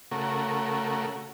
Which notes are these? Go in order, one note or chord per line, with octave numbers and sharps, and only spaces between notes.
C#3 A3 F#4 A#4